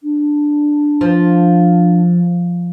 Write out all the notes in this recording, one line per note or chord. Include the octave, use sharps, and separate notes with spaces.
D4
F3